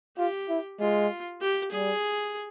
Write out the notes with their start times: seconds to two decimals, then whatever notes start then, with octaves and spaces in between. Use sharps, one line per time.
0.18 F4 G4
0.49 E4
0.80 G#3 F4
1.41 G4
1.72 G3 G#4